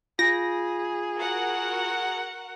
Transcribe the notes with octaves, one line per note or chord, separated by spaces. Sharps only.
F4 G#4 A#6
F#4 A#4 F#5